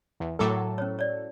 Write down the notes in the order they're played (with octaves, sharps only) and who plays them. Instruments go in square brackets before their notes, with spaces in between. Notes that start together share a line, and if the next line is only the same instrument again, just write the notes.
[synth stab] E2
[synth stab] A2 F#3 A4 [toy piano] A#4 D6
[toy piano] C#4 C5 C#5
C#5 D5